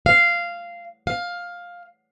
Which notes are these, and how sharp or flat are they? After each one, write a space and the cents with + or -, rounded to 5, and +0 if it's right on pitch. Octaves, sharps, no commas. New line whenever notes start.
F5 -10
F5 +10